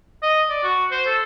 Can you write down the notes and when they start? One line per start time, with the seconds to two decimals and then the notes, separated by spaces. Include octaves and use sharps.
0.23 D#5
0.50 D5
0.64 F#4
0.91 C5
1.07 A4